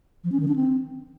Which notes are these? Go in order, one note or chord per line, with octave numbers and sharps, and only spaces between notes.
F3
C#4
D#3
D4
C4